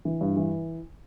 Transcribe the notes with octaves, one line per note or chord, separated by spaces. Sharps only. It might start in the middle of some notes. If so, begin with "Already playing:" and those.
E3
G2
E3